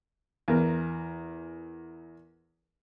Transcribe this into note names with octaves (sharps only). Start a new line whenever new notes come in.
E2 A#4